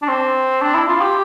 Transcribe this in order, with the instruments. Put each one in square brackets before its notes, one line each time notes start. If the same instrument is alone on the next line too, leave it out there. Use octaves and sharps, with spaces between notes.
[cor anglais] D4
C4
D4
E4
F4
G4